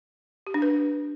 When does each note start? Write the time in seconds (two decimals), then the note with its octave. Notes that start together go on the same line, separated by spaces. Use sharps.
0.47 G4
0.54 D4
0.62 B4